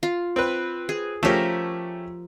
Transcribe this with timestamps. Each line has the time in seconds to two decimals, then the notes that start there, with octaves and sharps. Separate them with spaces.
0.03 F4
0.36 C4 B4
0.89 G#4
1.23 F3 A3 C#4 G4 A#4